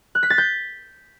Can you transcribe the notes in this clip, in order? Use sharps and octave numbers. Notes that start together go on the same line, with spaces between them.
F#6
B6
A6
G6